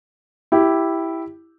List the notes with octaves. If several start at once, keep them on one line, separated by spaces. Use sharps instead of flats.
E4 G4